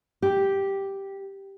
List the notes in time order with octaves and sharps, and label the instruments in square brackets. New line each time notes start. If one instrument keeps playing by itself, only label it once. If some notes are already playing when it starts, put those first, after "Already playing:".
[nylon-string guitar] G4